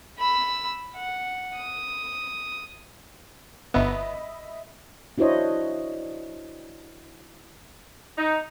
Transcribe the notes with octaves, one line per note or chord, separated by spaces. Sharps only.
B5 E6
F#5
D#6
G1 B3 D#5 E5 B5
D4 E4 F#4 C5 C#5 D#5
D#4